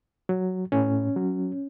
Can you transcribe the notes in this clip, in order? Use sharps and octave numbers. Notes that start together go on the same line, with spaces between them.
F#3
A2 C#4
F#3